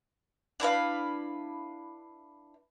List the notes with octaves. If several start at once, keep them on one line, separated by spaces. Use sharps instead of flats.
D4 E4 B4 F5